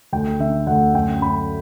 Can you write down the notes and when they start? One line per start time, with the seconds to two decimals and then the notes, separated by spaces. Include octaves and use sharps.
0.13 D2 G5
0.40 D3 E5
0.67 D2 F#5
0.94 F#2 G5
1.21 F#2 B5